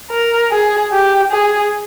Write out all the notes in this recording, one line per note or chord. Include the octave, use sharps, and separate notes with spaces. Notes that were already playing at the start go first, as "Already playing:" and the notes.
A#4
G#4
G4
G#4